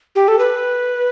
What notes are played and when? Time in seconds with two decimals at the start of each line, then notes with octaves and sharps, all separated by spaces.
0.15 G4
0.28 A4
0.39 B4